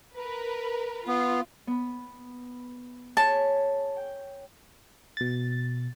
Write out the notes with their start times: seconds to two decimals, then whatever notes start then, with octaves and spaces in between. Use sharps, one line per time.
0.14 A#4 B4
1.08 B3 F4
1.67 B3 B5
3.17 G#4 C#5 G#5 A5
3.97 G5
5.17 B2 A6